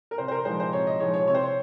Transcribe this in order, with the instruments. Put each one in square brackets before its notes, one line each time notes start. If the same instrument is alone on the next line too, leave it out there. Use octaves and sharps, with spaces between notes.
[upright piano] A#4
C3 C5
C5
A#4
F3 G#3 D#4 C5
C5
C3 C#5
D#5
F3 G#3 D#4 C#5
C#5
C3 C#5
C5
C#5